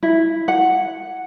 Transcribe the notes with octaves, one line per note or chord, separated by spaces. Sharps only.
E4
F#5